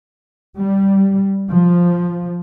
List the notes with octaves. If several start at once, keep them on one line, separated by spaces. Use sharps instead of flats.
G3
F3